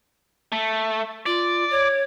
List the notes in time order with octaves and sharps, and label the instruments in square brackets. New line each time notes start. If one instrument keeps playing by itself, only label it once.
[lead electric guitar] A3
[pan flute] F4 [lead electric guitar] D5
[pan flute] C#5